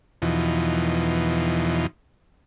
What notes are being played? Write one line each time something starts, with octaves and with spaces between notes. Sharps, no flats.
E2 B2 E3 F3 D#4